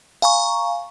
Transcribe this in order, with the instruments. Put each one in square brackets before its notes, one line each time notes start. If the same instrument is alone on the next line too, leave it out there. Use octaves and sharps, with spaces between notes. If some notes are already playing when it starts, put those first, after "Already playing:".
[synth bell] F5 G#5 A#5 C#6